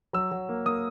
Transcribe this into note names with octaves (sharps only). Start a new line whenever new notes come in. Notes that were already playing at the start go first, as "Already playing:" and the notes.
F#3 E6
F#3
A#3
A#3 D#6